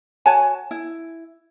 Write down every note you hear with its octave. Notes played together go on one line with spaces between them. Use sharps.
F#4 C#5 G#5 A5
E4